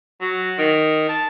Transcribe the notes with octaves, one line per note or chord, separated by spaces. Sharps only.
F#3
D#3
A5